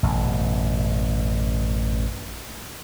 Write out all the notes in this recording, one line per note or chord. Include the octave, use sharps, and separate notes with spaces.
A1 F#2 B2